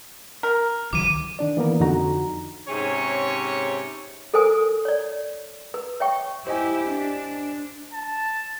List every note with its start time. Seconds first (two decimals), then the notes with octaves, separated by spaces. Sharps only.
0.43 A#4
0.93 C#2 D#3 F#3 D6 D#7
1.39 D#3 D4 D5
1.57 E3 A#3 B3 A#4
1.80 F2 D3 D#4 F#4 A#5
2.69 G#2 C3 C#4 G#4 C#5
4.34 A4 A#4 C5 G#5 D#6
4.85 C#5 D5
5.74 B4
6.00 C#5 E5 G5 C#6
6.47 E4 G4 C5 D#5 G#5
6.89 D4
7.94 A5